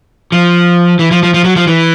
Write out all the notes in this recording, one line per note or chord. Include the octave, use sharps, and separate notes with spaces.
F3
E3
F3
F3
F3
F#3
F3
E3